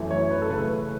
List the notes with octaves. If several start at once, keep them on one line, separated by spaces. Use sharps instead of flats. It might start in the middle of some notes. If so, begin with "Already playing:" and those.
Already playing: F#2 E3 A3 E4
C#5
B4
A4
C#3 A3 E4 B4